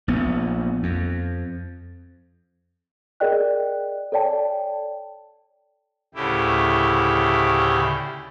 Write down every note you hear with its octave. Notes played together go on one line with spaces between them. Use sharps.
A#1 B3
F2
G#4 A#4 D5 D#5 G5 F#6
A4 C#5 D5 G5 A5
D2 A2 C#3 E4 G4